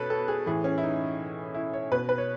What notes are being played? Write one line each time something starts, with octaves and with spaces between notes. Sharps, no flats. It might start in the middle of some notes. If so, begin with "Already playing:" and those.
Already playing: B2 A4 B4 C#5
A4
G#4
A2 E3 G#4
C#4
E4
D#4
E4
C#5
B2 B4
B4
C#5